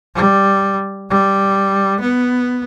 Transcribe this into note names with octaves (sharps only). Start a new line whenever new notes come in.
G3
G3
B3